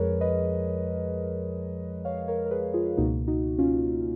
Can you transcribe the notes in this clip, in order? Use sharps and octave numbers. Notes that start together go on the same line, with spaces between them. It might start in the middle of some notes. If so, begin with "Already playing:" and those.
Already playing: F2 F3 G#3 G#4 A#4 B4 C#5
B4 D#5
C#5 F5
A#4 C#5
A#4
G#4 B4
F4 G#4
C#2 B2 A#3 D#4 F#4
D#4 F#4
C#4 F4